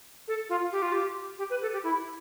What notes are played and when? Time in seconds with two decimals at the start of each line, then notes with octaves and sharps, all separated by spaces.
0.28 A4
0.49 F4
0.72 G4
0.82 F4
0.92 G4
1.38 G4
1.50 B4
1.62 A4
1.73 G4
1.83 E4